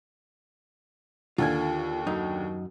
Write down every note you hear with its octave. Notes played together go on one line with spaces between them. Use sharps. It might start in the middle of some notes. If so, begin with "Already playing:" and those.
D#2 D3 F4 A4 G#5
F#2 D#4